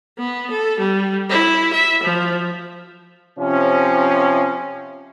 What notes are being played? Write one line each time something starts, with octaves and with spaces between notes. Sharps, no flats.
B3
A4
G3
E4
E5
F3
C3 F3 C#4